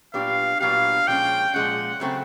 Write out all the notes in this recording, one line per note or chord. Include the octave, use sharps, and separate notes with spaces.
A#2 F#3 B3 D4 G4 F5
A#2 F#3 B3 D4 G4 F5
A#2 F3 G#3 C#4 G5
A#2 F3 G#3 C#4 F#5
C#3 F#3 A3 C4